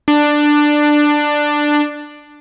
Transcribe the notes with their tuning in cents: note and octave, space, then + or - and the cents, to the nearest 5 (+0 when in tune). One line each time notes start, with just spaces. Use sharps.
D4 +10